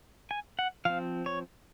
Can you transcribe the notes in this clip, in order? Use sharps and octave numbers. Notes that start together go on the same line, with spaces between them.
G#5
F#5
F3 C4 F5
C#5